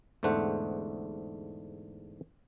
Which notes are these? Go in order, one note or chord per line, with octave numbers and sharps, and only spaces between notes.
E2 G#2 D3 A3 C5 F#5